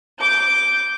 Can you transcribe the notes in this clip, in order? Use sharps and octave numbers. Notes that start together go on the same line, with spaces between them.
D6 G6